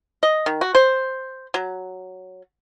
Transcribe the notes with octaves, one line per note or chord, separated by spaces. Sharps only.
D#5
D#3
F#4
C5
F#3